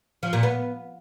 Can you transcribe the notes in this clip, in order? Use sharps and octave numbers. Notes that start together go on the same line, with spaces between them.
F3
A#2
B3